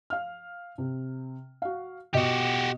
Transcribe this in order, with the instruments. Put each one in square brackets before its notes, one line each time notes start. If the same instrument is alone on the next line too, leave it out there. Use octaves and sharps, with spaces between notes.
[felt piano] F5 F6
C3
F#4 F5
[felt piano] B2 D#5 [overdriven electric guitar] F#4 G4